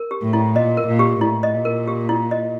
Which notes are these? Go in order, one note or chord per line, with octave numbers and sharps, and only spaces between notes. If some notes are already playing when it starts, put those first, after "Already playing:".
Already playing: A#4
G4
A2
E4
A#2 D#5
A#4
A#2
G4
A2 E4
D#5
A#2
A#4
G4
E4
D#5